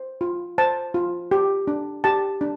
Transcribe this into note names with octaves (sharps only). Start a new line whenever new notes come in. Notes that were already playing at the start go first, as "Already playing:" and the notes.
Already playing: C5
F4
C5 A5
F4
G4
D4
G4 A5
D4